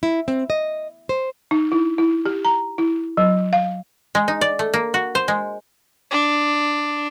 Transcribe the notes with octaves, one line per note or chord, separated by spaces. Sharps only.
E4
C4
D#5
C5
D#4
E4
E4
G4
A#5
E4
F#3
F5
G#3
D#4
D5
A3
A#3
F#4
C5
G#3
D4